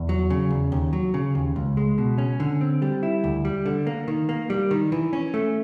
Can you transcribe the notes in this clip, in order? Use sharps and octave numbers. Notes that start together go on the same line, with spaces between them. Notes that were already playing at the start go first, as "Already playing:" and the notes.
Already playing: E2
F#3
C#3
E2
D#2
F#3
C#3
D#2
C#2
G#3
B2
C#4
D3
C4
G3
E4
D2
G3
D3
A#3
D#3
A#3
G3
D#3
E3
C#4
A3